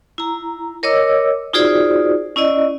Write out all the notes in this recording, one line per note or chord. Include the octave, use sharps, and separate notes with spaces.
E4 A#5
A#4 C#5 D#5 D6 E6
D#4 F4 F#4 G#4 C5 D5
C#4 E4 D5 D#5